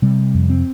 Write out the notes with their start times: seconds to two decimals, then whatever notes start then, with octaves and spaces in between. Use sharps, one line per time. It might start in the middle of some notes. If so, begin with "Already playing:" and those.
0.02 C3 G3
0.34 F2
0.50 C4